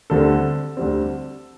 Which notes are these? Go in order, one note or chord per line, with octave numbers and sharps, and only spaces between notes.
D2 D3 G3 C4 A4
D2 D3 G3 C4